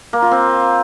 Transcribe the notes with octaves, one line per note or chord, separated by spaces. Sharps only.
A#3
F4
C4